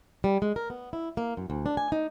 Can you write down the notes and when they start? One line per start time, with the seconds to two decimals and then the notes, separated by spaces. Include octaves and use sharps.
0.24 G3
0.42 G#3
0.56 A#4
0.70 B3
0.93 E4
1.17 A#3
1.37 F#2
1.50 D2
1.66 D4
1.77 G#5
1.92 D#4